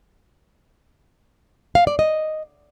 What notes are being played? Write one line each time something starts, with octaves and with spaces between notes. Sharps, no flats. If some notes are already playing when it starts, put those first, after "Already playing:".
F5
D5
D#5